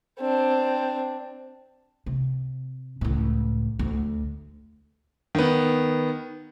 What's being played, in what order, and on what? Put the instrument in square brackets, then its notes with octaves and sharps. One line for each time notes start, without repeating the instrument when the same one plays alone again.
[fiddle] C4 D4
[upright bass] C3
C#2 A2
D2
[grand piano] D#3 B3